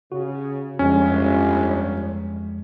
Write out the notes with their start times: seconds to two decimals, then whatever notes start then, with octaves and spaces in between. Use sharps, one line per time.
0.12 C#3 F#4
0.79 G1 F2 F3 G#3 C#4